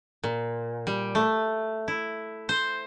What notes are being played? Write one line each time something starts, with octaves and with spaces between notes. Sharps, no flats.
A#2
G3
A3
E4
C5